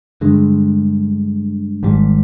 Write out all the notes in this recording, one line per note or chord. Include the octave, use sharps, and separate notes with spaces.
G2 D3 G#3
G#1 G#2 G3